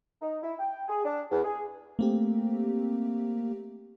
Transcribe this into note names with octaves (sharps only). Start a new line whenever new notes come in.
D#4
E4
G5
G#4
D4
E2
G#4
A3 A#3 C4 G4